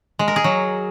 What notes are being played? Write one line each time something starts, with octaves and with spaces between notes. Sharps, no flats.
G#3
A#4
G#4
F#3